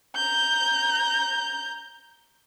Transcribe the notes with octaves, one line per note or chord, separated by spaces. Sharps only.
A#5 G6